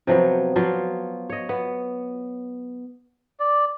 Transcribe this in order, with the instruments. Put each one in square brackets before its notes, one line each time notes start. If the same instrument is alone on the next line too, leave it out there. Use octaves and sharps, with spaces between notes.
[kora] C3 F3 F#3 B3
F3 F#3 B3 F4
C#5 D#5
B3
[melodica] D5